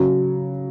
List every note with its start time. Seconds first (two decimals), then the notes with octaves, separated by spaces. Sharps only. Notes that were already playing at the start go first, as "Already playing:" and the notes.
Already playing: C#3 F#3